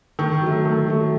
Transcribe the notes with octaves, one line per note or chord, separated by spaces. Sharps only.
D#3 C#6
F#3 A3
D#3
F#3 A3